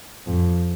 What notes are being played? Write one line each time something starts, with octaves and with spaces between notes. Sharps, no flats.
F2